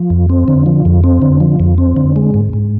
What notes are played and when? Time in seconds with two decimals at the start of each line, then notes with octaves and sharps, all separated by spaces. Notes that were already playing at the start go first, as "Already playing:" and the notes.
Already playing: F3
0.10 F2
0.30 C4
0.48 D3
0.66 F3
0.85 F2
1.04 C4
1.22 D3
1.40 F3
1.60 F2
1.78 C4
1.96 D3
2.16 G#3
2.34 G#2
2.53 G#2